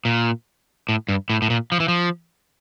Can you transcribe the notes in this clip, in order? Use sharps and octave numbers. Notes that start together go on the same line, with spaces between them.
A#2
A2
G2
A2
A2
A#2
F3
E3
F3